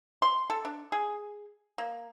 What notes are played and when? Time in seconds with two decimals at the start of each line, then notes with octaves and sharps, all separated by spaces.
0.22 C6
0.50 A4
0.65 D4
0.92 G#4
1.78 A#3